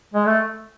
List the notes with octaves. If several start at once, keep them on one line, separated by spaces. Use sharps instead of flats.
G#3
A3